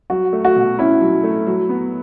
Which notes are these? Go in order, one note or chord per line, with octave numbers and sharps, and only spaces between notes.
F#3 F#4
A3
F#4
B2
C#4 E4
F#3
A3
F#3
B3